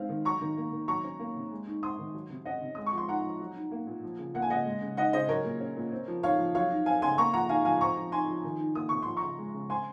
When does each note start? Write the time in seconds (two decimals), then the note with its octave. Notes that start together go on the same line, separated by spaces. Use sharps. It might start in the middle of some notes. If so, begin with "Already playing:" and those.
Already playing: G#3 C4 D#4 F5
0.09 D#3
0.25 F#3 A#5 C#6
0.41 D#3
0.57 A#3
0.72 D#3
0.88 F#3 A#5 C#6
1.04 C#4
1.19 A#3
1.35 C3
1.51 G#3
1.67 D#4
1.83 C4 C6 D#6
1.99 D#3
2.14 F#3
2.30 C3
2.46 C#4 D#5 F#5
2.62 C3
2.75 G#3 D#6
2.86 C#6
2.93 F3 C6
3.08 D#4 F#5 A#5
3.24 F3
3.40 F#3
3.56 D#4
3.71 A#3
3.87 A#2
4.03 F3
4.18 C#3
4.34 A#3 F#5
4.42 G#5
4.50 C#3 D#5 F#5
4.66 G#3
4.81 C#3
4.97 D#4 D#5 F#5
5.13 C#3 C5 D#5
5.29 F#3 A#4 C#5
5.45 A#2
5.61 C#4
5.77 A#2
5.92 C4
6.08 F3
6.23 D#4 C#5 F5
6.39 F3
6.55 F#3 C#5 F5
6.71 D#4
6.86 C4 F5 G#5
7.02 C#3 G#5 C6
7.18 A#3 A#5 C#6
7.33 F3 F#5 A#5
7.49 D#4 F5 G#5
7.65 F3 F5 G#5
7.81 C4 A#5 C#6
7.97 F3
8.12 D#4 G#5 C6
8.29 F3
8.44 D#3
8.60 D#4
8.75 A#3 D#6
8.89 C3 C#6
9.02 F3 C6
9.17 A#5 C#6
9.23 C#3
9.38 G#3
9.54 C#3
9.69 C4 G#5 C6